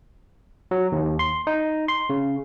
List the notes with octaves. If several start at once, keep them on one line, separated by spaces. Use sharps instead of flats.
F#3
D#2
C6
D#4
C6
C#3